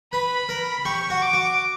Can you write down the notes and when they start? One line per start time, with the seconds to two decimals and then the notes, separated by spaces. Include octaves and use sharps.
0.12 B4 B5
0.49 A#4
0.85 G4 C#6
1.10 F#4
1.22 D6
1.33 F#4